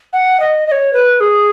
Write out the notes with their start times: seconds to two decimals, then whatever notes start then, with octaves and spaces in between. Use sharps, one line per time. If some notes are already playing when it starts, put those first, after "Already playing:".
0.13 F#5
0.40 D#5
0.67 D#5
0.72 C#5
0.93 B4
1.20 G#4